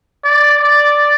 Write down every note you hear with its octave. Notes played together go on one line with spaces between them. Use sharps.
D5
D5